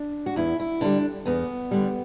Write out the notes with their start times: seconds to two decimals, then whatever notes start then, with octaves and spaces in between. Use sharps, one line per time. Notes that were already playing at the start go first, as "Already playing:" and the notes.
Already playing: D4
0.26 F#4
0.36 E2 E4
0.60 E4
0.81 D3 G3 D4
1.25 E2 B3
1.71 D3 G3